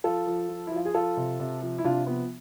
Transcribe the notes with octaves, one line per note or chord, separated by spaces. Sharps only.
F3 F4 A4
F3
F3
E4
F3 F4
G#4
F3 F4 A4
C3
C3
F3
E4
C3 D4 F4
F3 B3